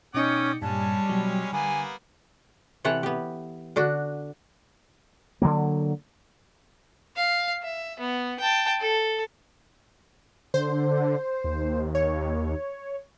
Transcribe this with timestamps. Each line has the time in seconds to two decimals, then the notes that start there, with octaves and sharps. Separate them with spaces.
0.15 B2 C#4 D#4 D5 G5 D#6 C#7
0.62 G2 A#2 G3 G#3 C#4 A5
1.09 B2 F#3
1.53 D3 A#3 B3 G#5
2.85 C3 E3 A4 C#5 F#5
3.03 B3 G4
3.76 D3 D4 F#4
5.42 D3 E3 F#3 A#3
7.17 F5
7.63 E5
8.00 B3
8.40 G5 A5
8.80 A4
10.54 D3 C5
11.44 D#2
11.95 C#5